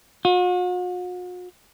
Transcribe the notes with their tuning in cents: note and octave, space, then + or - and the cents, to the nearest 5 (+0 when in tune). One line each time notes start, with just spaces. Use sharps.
F#4 -45